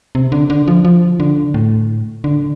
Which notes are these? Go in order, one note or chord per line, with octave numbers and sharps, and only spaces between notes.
C3
D3
D3
F3
F3
D3
A2
D3